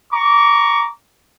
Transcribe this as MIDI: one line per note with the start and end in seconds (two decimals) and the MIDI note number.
0.12 0.87 82
0.12 0.87 85
0.12 0.87 86